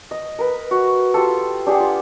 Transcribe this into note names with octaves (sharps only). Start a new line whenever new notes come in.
D#5
A#4 B4
F#4
F4 G4 A4
D4 G4 G#4 F#5
F4